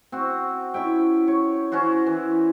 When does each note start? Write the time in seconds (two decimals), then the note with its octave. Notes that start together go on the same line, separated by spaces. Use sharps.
0.12 C4 F#4
0.74 C#4 E4 E5 G5
1.28 C#5
1.72 C#4 E4 F#4 C5
2.07 E3